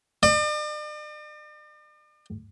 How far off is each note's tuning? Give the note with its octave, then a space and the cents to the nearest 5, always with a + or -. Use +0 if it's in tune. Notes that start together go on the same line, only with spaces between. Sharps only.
D5 +45